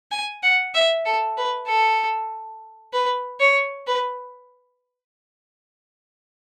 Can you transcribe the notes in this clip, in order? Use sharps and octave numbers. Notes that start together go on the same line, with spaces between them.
G#5
F#5
E5
A4
B4
A4
B4
C#5
B4